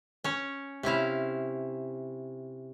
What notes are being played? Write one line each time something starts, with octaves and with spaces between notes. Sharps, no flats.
C#4 C#5
C3 C#4 E4 F5